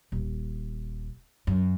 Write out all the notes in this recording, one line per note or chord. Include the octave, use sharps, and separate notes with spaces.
D#1
F#2